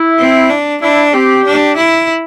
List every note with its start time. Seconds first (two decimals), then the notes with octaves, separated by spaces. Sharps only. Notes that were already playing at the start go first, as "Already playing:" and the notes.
Already playing: E4
0.19 C4
0.50 D4
0.81 D4 E4
1.13 C4 G4
1.45 D4
1.77 E4